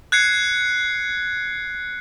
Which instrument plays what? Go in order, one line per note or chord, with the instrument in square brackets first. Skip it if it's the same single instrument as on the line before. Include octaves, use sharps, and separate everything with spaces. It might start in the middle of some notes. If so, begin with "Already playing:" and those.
[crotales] F#6 G#6 C7 C#7